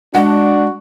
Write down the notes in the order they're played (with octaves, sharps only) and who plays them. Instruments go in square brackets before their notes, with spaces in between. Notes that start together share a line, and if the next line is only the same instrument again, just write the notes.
[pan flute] G#3 [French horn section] D4 [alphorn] F#4 [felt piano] F#5